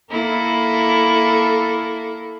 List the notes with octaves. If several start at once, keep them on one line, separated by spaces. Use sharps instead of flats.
A#3 E4 A4